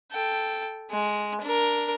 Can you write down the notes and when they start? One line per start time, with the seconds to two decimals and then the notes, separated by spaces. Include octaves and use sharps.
0.12 A4 G5
0.91 G#3
1.42 D4 A#4